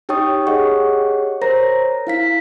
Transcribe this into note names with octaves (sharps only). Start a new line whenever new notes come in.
D#4 G4 C#5 G5 C#6 D#6
G4 G#4 C#5 D#5 F#5 C#6
A#4 C5 C#5 A#5 A#6
E4 F5 B6